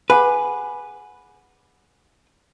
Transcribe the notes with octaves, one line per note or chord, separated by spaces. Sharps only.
G#4 B4 F#5 G#5